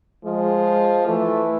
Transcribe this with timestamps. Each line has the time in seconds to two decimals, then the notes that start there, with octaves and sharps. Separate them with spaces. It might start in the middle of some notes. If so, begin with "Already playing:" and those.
0.25 F3 G#3
1.06 E3 A3